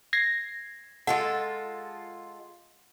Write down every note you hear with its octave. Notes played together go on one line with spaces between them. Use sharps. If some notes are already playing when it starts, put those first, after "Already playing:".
G#6 A#6 C7
G#3 F4 A4 F#5